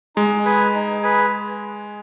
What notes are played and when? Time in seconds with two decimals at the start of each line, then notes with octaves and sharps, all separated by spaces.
0.16 G#3 D#4
0.45 G#4 B4
0.75 D#4
1.02 G#4 B4